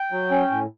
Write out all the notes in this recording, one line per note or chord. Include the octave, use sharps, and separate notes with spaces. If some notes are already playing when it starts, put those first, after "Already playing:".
Already playing: G5
F#3
C#4
A2